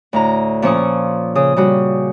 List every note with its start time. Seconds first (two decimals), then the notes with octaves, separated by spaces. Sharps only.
0.13 D2 A2 A#5
0.62 A#2 F3 C#4 C#6 D#6
1.35 C#3 D#6
1.56 C#3 G3 F#4